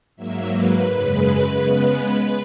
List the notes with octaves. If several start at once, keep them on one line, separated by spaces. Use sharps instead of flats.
G#2 F#3 A#3 E5
B4
F#2 C#3 G#3 B4
C#3 G#3 B3